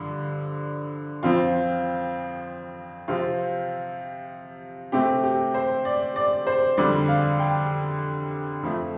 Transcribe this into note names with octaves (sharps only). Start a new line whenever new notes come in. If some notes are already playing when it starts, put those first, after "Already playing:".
Already playing: G2 D3 F3
F2 F3 C4 F4
C3 F3 C4 F4
C3 A3 C4 G4
G4
C5
D5
D5
C5
F2 D3 G3 D5
F5
G5
F2 F3 A3